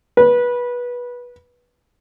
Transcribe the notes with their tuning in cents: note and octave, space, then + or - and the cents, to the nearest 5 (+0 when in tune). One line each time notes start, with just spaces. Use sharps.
B4 -20